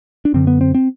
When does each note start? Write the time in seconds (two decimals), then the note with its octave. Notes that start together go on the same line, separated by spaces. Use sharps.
0.25 D4
0.34 F#2 D3 C4
0.47 B3
0.61 C4
0.75 C4